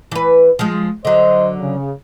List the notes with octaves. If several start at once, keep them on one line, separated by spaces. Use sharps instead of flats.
E3 B4
F3 G#3
D3 F#3 C5 D#5
C#3